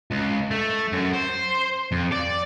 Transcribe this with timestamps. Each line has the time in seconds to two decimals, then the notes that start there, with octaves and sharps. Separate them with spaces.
0.11 C#2
0.51 A3
0.93 F#2
1.13 C5
1.92 F2
2.12 D5